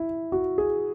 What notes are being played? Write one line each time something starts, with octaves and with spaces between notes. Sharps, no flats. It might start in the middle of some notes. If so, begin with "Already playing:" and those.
Already playing: E4
F#4
G#4